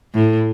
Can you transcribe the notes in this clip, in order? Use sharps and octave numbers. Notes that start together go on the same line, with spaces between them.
A2